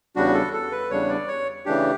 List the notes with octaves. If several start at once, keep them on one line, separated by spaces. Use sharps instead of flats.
E2 C#3 G3 D4 F#4
A4
A4
B4
E2 C#3 G3 D4 C#5
D5
C#5
C#3 E3 A3 D4 G4